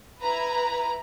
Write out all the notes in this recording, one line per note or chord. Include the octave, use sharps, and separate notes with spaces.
E4 B4 A#5 B5